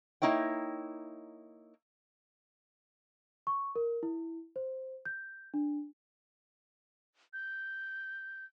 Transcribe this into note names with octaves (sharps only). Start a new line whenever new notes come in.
A#3 D#4 E4 C#5 G5
C#6
A#4
E4
C5
G6
D4
G6